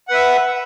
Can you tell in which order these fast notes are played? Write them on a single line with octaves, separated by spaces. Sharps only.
F#5 B4 E5